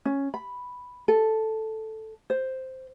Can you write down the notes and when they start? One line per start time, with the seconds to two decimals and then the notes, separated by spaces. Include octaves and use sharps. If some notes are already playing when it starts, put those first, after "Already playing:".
0.05 C#4
0.34 B5
1.08 A4
2.30 C5